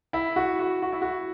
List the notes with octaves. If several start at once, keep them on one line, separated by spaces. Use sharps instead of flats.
E4
F#4
F#4
F#4
E4
F#4